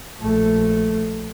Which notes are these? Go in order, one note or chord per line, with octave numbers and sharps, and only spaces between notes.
A#1 A3